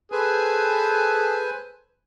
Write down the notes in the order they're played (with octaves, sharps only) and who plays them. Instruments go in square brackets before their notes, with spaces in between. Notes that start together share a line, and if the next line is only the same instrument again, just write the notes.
[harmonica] G#4 A4 [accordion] B4 C5 G#5